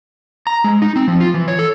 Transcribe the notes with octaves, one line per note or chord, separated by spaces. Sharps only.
A#5
G#3
D#4
C4
F3
F4
E3
C#5
A4